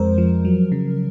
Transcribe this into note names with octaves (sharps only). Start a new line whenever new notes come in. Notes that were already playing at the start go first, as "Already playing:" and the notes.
Already playing: F2 F3 G#3 A#4 C5
F3
F#3
C#3